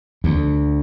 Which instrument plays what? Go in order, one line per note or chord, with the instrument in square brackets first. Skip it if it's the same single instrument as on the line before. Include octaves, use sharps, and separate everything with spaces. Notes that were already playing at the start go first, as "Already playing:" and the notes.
[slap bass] D2